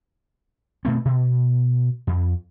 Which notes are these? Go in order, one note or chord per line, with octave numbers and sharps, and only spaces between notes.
B2 A3 C4
B2
F2